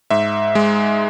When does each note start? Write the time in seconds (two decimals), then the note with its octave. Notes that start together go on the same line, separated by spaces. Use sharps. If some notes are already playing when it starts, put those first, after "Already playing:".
0.10 G#2 E5
0.55 G#3